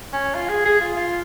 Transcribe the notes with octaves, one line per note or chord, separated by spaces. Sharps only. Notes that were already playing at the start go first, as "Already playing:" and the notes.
C#4
F4
G#4
G#4
F4
F4